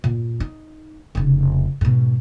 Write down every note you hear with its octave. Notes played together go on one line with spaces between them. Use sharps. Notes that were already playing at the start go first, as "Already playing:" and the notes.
A#2
D#4
F1 C#3
G#2 B2